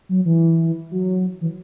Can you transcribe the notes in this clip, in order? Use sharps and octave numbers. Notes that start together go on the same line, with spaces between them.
F#3
E3
F#3
E3